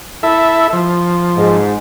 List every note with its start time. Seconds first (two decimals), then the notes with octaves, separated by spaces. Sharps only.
0.23 E4 A4 E5
0.73 F3
1.36 G#2